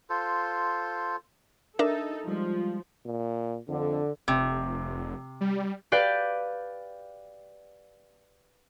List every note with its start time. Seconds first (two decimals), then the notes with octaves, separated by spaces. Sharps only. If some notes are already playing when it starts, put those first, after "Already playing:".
0.10 F4 A4 C5
1.79 D4 D#4 A4 A#4 E5
2.28 F3 G3 G#3
3.06 A#2
3.69 F2 D3
4.28 F1 C3
5.41 G3
5.92 G4 B4 D5 F5 G5